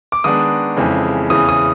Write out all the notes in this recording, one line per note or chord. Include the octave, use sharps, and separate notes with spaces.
D6
D#3 G#3 B3 D4 D#6
F2 C#3 E3 G#3
E2 C#3 E3 D#6
D#6